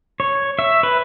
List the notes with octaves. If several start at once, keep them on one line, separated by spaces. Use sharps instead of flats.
C#5
E5
B4